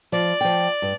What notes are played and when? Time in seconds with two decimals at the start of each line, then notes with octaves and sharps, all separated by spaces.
0.12 F3 D5
0.41 F3 G5
0.82 G2